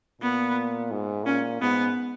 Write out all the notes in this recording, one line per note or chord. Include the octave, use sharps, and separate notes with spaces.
A#2 B3
G#2
A#2 C#4
G#2 B3